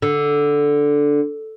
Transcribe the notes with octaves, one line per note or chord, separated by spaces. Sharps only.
D3